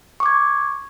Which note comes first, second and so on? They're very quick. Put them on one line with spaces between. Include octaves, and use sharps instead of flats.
C#6 D6 G#6